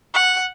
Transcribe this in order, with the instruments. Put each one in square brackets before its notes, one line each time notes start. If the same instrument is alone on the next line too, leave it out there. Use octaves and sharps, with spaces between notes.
[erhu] F#5